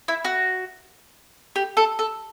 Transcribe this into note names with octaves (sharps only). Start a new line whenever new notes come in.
E4
F#4
G4
A4
A4